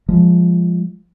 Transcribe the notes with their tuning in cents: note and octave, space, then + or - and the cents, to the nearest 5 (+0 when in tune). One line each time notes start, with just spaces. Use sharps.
F3 +0 G#3 -15